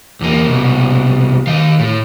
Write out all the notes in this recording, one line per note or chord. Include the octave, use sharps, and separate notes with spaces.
E2 A#3
C2 B2
D#3 F5
A2